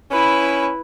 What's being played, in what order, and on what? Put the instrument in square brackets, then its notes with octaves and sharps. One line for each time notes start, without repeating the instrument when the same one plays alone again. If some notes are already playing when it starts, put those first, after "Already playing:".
[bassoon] C#4 [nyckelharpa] E4 B4